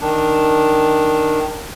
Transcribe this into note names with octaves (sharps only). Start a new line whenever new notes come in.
D#3 D4